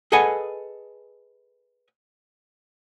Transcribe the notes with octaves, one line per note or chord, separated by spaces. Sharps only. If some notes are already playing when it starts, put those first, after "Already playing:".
G#4 A4 B4 D#5 F#5 G#5